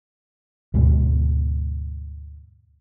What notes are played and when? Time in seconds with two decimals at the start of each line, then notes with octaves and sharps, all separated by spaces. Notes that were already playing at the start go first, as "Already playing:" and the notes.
0.74 D2 G#2 B2 G#3